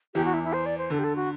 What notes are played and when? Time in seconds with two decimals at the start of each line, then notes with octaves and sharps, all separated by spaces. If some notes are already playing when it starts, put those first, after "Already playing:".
0.14 E2 E3 G4
0.25 F#4
0.33 E4
0.43 E4
0.53 C5
0.66 D5
0.78 C5
0.90 D3 A4
0.99 G4
1.04 A4
1.15 F#4